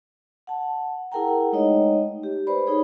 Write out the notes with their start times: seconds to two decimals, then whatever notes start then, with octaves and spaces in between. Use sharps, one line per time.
0.47 F#5 A5
1.12 E4 G#4 A#4 F#5 G5 A#5
1.52 G#3 A3 D#4 C#5 D#5
2.23 G4
2.47 B4 C5 D5 B5
2.67 D#4 G#4 C#5